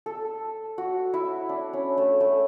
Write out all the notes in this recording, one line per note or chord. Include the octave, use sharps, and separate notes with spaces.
A4
F#4
E4
D4
C#4
A3
A3